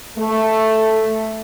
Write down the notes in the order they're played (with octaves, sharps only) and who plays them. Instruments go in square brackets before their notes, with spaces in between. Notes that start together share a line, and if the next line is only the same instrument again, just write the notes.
[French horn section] A3